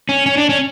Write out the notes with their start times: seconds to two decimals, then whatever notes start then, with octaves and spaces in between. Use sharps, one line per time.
0.09 C#4
0.26 C#4
0.37 D4
0.49 C#4